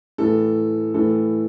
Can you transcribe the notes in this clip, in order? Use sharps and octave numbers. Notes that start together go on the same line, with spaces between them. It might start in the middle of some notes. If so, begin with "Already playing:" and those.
A2 E3 A4
A2 E3 A4